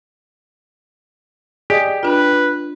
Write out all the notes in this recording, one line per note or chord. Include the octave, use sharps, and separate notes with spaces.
G4 G#4 D5 D#5
D4 F4 B4